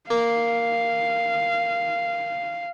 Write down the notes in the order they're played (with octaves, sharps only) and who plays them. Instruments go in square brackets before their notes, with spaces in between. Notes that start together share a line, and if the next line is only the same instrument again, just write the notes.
[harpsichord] A#3 [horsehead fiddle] F5